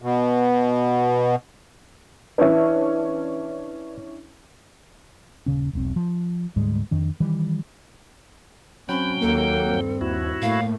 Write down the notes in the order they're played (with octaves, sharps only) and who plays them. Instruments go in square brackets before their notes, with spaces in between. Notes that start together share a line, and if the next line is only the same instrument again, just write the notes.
[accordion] B2
[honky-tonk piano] E3 C#4 D4 [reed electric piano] B4 E5
[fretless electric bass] D#1 C#3 C#4
E1 B1 C4
F3
D2 G#2 G3 G#3
F2 D#3 D4
D#3 E3 G3
[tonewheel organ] F#3 G5 [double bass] C4 C#4 [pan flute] B5
[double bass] D#2 [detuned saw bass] A#3 [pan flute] A4
[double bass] G2 C4
[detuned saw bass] D#2 [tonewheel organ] E4 F#4
[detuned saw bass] A2 [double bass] A3 A#3 [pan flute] F5